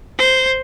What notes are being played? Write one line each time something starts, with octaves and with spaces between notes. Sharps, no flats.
C5